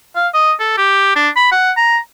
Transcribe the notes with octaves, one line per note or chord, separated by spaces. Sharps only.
F5
D#5
A4
G4
D4
B5
F#5
A#5